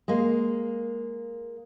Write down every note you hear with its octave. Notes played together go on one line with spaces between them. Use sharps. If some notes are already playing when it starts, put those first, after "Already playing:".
G#3 A#3